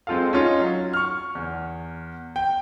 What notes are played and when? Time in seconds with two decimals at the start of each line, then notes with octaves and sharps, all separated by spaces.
0.07 G#3 C4 F4 A4 F5
0.33 C#4 D#4 F4
0.59 F#3
0.93 C#6 F6
1.35 E2
2.36 G5